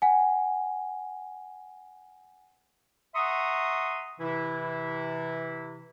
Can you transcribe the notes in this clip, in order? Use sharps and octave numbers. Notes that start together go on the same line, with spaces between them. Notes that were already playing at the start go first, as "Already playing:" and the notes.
F#5 G#5
E5 F#5 A#5 C6 C#6 D#6
C3 E3 E4